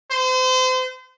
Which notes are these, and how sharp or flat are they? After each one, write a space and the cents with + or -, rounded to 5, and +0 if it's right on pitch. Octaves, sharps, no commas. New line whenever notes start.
C5 -35